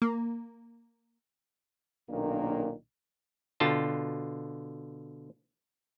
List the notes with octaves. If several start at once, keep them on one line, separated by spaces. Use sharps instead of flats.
A#3
B1 A#2 D#3 A#3 C#4 D4
B2 D3 F4 G5 A5